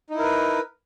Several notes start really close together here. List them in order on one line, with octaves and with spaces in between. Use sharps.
D#4 E4 A#4 B4